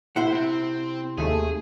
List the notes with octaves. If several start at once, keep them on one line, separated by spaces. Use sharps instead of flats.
C3 E4 C5 F#5
C4
D#2 A3 G#4